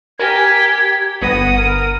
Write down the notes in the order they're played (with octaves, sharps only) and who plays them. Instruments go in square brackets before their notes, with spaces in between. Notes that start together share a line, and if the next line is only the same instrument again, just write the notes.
[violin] G4 B6 [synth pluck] A#4 G#5 [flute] G#6
[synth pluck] G1 B3 A#6 [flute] F#5 [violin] D#6
[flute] A#4